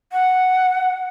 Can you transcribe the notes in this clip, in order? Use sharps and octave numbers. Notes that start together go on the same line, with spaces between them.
F#5